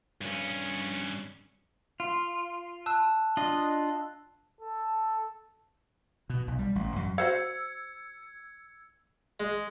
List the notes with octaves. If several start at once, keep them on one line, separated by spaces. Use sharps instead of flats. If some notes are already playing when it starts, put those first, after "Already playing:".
G2 C#4
F4
A5 E6 F#6
D4 F4 D#5
A4
B2
B1
G3
A1
F#2
F#4 C5 F5 E6 G#6 C#7
G#3